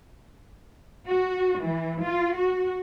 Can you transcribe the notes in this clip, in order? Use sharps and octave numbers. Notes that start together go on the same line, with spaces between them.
F#4
E3
F4
F#4